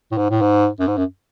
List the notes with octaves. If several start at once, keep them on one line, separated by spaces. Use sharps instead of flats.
A2
G#2
A2
G#2
F#2
G#2
F#2